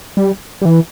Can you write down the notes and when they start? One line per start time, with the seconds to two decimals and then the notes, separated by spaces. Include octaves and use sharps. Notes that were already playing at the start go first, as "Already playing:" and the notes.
0.17 G3
0.62 G3
0.65 E3